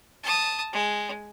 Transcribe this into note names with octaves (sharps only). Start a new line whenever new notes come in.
A5 D#6
G#3